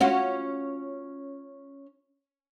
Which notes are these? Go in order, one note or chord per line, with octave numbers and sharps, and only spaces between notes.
C#4 F4 F#4